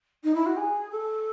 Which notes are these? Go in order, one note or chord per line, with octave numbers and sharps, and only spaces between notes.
D#4
E4
F#4
G#4
A4